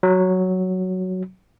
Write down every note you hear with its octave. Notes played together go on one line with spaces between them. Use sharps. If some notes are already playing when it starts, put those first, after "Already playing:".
F#3